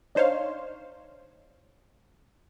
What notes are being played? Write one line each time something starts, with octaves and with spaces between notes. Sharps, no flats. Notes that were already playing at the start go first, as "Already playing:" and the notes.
D4 D#4 C5 C#5 F5